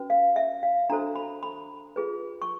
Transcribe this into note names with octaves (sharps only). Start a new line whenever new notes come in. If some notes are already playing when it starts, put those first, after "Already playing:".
Already playing: C#4 F#4 B4
F5
E5
F5
D4 F#4 A4 C5 A#5
B5
B5
F4 G#4 B4
C#6